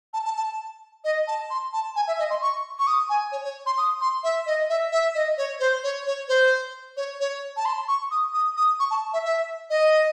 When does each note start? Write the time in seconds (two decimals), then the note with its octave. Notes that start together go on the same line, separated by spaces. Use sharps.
0.13 A5
0.25 A5
0.36 A5
1.04 D#5
1.27 A5
1.50 C6
1.73 A5
1.96 G#5
2.07 E5
2.19 D#5
2.30 C6
2.41 C#6
2.79 C#6
2.87 D#6
3.09 G#5
3.32 C#5
3.44 C#5
3.66 C6
3.78 D#6
4.01 C6
4.23 E5
4.46 D#5
4.69 E5
4.92 E5
5.15 D#5
5.37 C#5
5.60 C5
5.83 C#5
6.06 C#5
6.28 C5
6.97 C#5
7.20 C#5
7.56 A5
7.65 C6
7.88 C#6
8.11 D#6
8.33 D#6
8.56 D#6
8.79 C#6
8.90 A5
9.13 E5
9.25 E5
9.70 D#5